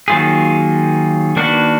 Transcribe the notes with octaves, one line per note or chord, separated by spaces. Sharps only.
D#3 F#3 A#3 F4 G#4
D#3 A#3 D4 F#4 B4